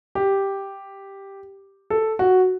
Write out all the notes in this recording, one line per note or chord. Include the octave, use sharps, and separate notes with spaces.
G4
A4
F#4